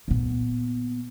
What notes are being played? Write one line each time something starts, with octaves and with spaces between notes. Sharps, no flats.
A#2 B3